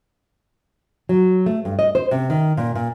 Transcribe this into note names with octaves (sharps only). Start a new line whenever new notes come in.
F#3
A3
G2
D#5
C5
C3
D#3
A#2
A#2